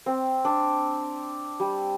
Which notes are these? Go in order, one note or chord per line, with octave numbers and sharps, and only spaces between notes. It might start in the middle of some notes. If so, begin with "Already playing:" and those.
C4
D4
G3